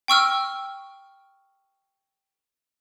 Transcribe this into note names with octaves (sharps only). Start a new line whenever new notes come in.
G5 C#6 E6 F6